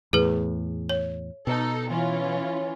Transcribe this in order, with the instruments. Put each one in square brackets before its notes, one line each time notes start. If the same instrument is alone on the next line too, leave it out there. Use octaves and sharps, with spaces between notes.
[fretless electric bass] E2 A2 [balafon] G#4 B4
[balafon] C#5
[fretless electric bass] B2 [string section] D#4 A4
[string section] E3 C#4 F4